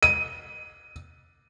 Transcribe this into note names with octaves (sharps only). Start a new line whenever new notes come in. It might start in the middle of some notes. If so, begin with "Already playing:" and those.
D#7